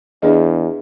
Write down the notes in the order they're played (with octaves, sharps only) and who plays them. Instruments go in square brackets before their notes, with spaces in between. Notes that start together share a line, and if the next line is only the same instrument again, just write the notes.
[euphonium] E2 [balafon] D4 G#4 D#5